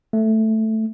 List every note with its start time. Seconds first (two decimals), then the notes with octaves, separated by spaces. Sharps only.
0.13 A3